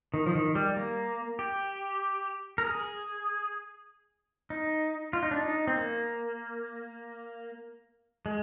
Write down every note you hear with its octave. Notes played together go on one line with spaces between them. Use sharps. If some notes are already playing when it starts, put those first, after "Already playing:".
D#3
F3
D#3
G3
A#3
G4
A#4
G#4
D#4
F4
D#4
D4
D#4
C4
A#3
G#3